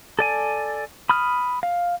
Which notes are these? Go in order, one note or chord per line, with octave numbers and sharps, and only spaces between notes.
A4 D5 G#5
B5 D#6 F6
F5